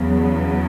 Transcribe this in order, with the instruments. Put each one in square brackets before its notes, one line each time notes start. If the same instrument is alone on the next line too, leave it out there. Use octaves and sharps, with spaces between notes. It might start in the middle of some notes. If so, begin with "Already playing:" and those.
Already playing: [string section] E2 C#3 F#3 B3